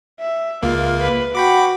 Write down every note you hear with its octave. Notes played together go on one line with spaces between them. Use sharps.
E5
C#2 A#3 F4
B4
F#4 G5 B5 D6